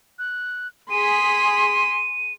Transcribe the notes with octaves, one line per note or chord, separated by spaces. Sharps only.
F#6
G#4 C6 B6 D#7